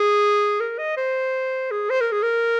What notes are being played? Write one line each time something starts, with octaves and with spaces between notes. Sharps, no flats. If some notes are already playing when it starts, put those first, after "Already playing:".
Already playing: G#4
A#4
D#5
C5
G#4
C5
A#4
G#4
A#4